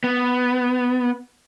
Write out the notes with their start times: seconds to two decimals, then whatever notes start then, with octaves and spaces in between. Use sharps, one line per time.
0.04 B3